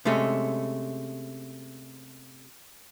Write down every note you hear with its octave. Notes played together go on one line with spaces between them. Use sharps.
C3 G#3 A3 C#4